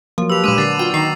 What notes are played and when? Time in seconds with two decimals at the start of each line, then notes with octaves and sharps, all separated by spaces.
0.18 F3 F#3 A#3
0.30 G4 B4 E6 F7
0.44 A#2 G#3 D4 B4 D6 D#7
0.58 D3 D4 A6 C7
0.79 F4 F#4 G5
0.94 D#3 D#4 C7